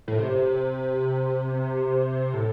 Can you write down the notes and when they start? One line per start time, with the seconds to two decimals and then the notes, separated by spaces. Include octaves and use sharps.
0.08 A2
0.18 C3
2.34 A2